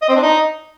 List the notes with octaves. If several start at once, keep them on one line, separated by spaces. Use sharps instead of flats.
D#5
C4
D4
D#4